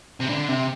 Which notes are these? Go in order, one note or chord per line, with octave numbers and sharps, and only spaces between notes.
C3
D3
C3